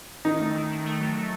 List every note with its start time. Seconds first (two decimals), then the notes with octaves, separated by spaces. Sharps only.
0.25 D#3 D#4
0.40 A3
0.55 D#3
0.70 D#3
0.84 A3
1.00 F#3
1.14 A3